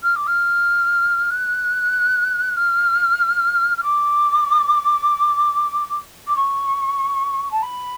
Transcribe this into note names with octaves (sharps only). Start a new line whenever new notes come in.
F6
D6
F6
F#6
F6
F6
D6
D6
C#6
A5
B5